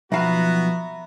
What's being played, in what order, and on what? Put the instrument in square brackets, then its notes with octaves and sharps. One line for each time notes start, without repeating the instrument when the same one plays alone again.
[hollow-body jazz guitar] B1 F5 [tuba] F3 [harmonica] B3 F#4 [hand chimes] E5 A#5 B5